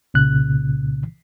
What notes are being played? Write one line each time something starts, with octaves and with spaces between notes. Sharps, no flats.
C2 A#2 C#3 F#6